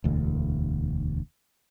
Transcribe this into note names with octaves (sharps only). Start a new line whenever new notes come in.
E1 D2